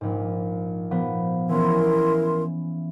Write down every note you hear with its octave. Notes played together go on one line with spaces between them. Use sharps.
A#1 G#2
A#2 F3 B3
E3 B3 C#4 E4 A#4 C6